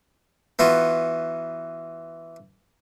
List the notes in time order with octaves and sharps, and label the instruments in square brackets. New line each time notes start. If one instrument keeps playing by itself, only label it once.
[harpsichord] E3 B3 F4 F#4